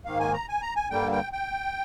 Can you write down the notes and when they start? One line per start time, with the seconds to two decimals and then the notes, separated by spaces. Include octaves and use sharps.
0.05 G#2 D#3 A#3 F5
0.20 G#5
0.34 A#5
0.49 G#5
0.62 A#5
0.76 G#5
0.90 G2 D3 G3 A#3 G5
1.12 G5
1.33 G5